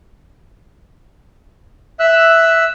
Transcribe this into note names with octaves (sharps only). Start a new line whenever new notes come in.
E5 E6 F#6